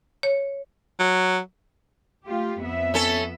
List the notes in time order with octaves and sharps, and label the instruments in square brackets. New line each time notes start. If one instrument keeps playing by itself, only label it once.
[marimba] C#5
[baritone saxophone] F#3
[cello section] A3 F4 G4
F2 B3 E5
[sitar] C#4 A4